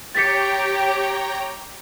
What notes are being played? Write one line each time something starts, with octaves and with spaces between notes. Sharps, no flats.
G4 C#5 G5 A#5 A6 B6 C#7